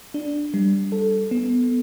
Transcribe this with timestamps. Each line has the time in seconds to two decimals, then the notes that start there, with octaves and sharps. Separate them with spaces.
0.14 D4
0.54 G3
0.92 A4
1.31 B3